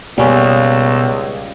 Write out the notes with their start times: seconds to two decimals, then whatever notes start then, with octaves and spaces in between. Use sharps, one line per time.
0.18 C#2 B2 G3 A#3 C#4